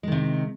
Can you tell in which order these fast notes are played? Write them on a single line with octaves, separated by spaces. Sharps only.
G#3 D#3 C3